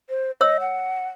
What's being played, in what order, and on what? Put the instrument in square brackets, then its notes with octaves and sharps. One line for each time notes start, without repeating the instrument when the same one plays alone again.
[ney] C5
[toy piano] C#5 E6 [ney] D#5
[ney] F#5